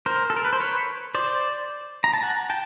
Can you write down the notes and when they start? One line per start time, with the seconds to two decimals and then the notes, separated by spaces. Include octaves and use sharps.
0.06 A#4 C5
0.30 A4
0.36 A#4
0.45 B4
0.53 C5
0.60 B4 C#5
1.15 C5 D5
2.04 A#5
2.14 A5
2.22 F#5 G#5
2.50 G5 A5